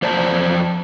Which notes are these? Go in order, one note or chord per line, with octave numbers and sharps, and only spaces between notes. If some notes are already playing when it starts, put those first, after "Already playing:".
F2 C5 D5 A5